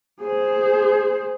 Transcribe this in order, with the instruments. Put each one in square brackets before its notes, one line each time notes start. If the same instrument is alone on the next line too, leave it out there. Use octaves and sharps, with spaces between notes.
[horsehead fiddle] G#4 C5